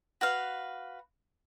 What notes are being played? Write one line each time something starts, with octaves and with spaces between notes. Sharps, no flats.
F#4 B4 F5